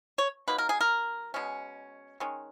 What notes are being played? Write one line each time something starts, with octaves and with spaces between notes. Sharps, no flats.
C#5
F#3 A#3 D#4 B4
A#4
G#4
A#4
B2 G#3 C#4
D#3 G#3 C#4